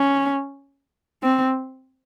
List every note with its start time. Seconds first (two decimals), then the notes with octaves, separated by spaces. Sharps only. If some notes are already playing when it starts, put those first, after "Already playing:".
Already playing: C#4
1.23 C4